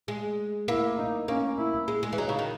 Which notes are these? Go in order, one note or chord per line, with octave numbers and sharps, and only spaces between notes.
G#3
A#3 E4
D#4
A#3 C#4
E4
G#3
G#3
E3
F#3 D#4
C#3
D#3